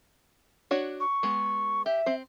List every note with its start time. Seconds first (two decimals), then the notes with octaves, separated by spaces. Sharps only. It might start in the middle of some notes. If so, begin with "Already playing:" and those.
0.71 D4 F#4 C#5
1.00 C#6
1.23 G#3 B3
1.86 G4 E5
2.06 C4 C5